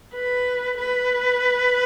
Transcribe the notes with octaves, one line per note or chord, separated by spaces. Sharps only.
B4
B4